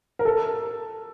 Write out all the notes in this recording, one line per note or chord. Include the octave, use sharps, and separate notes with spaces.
A#4
A4